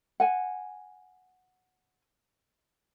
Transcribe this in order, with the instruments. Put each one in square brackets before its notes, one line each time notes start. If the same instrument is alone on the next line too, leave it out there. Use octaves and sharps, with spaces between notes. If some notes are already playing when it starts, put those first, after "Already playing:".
[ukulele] F#5 G#5